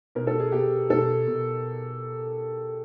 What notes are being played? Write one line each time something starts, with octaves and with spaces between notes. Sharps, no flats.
B2 A#4
A4
G#4
B2 G4
B2 A4
B2